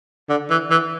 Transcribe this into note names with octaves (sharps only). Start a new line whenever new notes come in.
D3
E3
E3